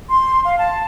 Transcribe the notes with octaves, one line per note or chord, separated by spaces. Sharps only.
C6
F5
A5